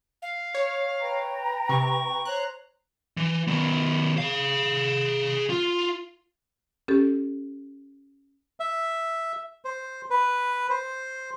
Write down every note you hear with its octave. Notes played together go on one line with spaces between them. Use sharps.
F5
C#5
B4 G5 A#5
C3 C#6
C5 C#5 A#5 F#6
E3
D#3 B3
G#4 F5
F4
C#4 G4 A4
E5
C5
B4
C5